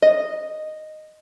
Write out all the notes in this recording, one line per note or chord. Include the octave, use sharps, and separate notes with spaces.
D#5